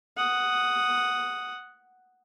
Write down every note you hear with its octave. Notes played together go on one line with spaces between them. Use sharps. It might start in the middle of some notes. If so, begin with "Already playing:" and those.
F#5 D#6